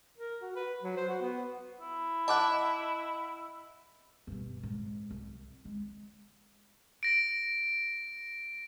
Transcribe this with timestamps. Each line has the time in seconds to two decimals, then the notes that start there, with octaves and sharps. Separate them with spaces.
0.17 A#4
0.41 F#4
0.56 B4
0.82 F#3
0.97 C5
1.08 F#4
1.22 B3
1.81 E4
2.28 D#5 F#5 A5 D6 F#6
4.27 G2 B2
4.63 G#2
5.11 C2
5.65 G#3
7.03 A#6 D7